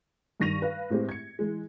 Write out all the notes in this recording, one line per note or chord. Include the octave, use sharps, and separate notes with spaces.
G2 D#3 C#6 A#6 D#7 F7
B4 F5
A2 G#3 C4 G4
G#6 C#7
E3 G#3